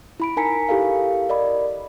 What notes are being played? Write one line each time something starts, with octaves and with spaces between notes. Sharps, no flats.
E4 B5 D7
D#4 A#4 G#5 A#5 B6 C#7
E4 G4 A4 A#4 F5
A#4 D5 D#5 B5